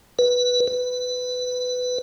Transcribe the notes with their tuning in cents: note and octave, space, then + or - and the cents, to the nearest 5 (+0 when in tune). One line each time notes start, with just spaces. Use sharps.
B4 -5
B4 +15